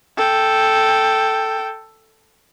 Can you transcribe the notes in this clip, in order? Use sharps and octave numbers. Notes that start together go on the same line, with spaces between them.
A4 G5